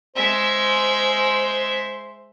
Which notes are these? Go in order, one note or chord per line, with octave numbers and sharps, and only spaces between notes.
G#3 C5 E5